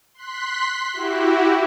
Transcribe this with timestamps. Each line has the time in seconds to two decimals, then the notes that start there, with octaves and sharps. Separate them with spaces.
0.14 C6 F#6 B6
0.93 E4 F#4 G4